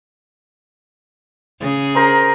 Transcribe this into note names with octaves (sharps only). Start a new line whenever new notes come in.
C#3 G#4
A#4 C5 A#5